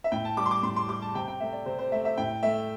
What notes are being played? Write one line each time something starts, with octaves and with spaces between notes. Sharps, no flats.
E5
A2 G5
A5
G3 D6
C6
D6
A2 C6
C6
G3 D6
A5
C3 G5
G5
A3 E5
D5
C3 C5
C5
A3 E5
E5
A2 G5
A3 E5